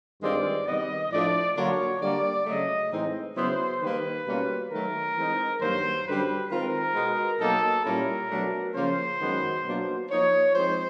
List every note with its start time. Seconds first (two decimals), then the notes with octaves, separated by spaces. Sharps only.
0.22 G2 D#3 G#3 C4 F4 D5
0.66 C3 D#3 G3 B3 D#5
1.11 A2 F3 A3 D4 F4 D5
1.56 D3 F#3 A#3 D4 F4 C#5
2.01 D3 G3 A#3 D5
2.46 C#3 F#3 A3 D#5
2.91 A2 E3 G#3 C4 D#4
3.36 C#3 F#3 B3 E4 C5
3.81 D#3 G3 A#3 B4
4.26 B2 G3 A#3 C#4 F4
4.70 D#3 F#3 A3 A#4
5.16 E3 G#3 C4 D#4
5.60 G2 D#3 F#3 A#3 C5
6.06 F#2 D3 G3 B4
6.51 D#3 G#3 C4 F4 A#4
6.95 B2 G#3 B3
7.40 B2 F#3 A#3 D#4 A4
7.85 A#2 G3 A#3 C#4 E4 A#4
8.30 B2 F#3 A3 D4
8.75 C#3 F3 A#3 C#4 F4 C5
9.20 F#2 D#3 G#3 B3
9.65 B2 F#3 A#3 D4 F4
10.10 F3 A#3 D#4 C#5
10.54 F3 G#3 C4 D#4 C5